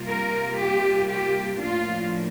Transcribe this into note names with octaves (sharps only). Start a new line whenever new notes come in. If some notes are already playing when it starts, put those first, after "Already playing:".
Already playing: C3 G3 A#3 F4
A#4
G4
G4
A2 F3 A#3 D4 F4